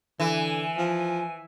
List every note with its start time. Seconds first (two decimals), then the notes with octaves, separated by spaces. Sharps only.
0.20 D3 E3 G#5
0.77 F3